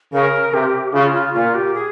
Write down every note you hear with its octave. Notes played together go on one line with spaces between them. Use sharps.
C#3 A#4
C3 G4
C#3 F4
F4
A#2 F4
G4
G#4